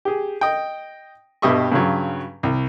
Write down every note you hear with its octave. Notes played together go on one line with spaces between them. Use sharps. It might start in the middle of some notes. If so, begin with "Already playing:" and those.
G4 G#4
D#5 G5
G2 B2 G4 D#5 E5 C#6
G2 C#3 F#3
C2